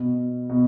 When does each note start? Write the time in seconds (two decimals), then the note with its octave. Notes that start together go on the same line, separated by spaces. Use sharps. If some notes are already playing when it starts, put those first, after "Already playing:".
Already playing: B2
0.49 B2